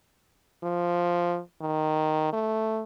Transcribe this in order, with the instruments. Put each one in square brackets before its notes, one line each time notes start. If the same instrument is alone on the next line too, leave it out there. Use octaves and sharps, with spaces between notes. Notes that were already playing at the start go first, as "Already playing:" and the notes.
[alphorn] F3
D#3
A3